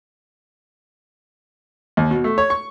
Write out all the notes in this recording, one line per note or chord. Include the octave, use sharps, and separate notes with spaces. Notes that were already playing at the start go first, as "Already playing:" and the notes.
D#2
B2
A3
C#5
C#6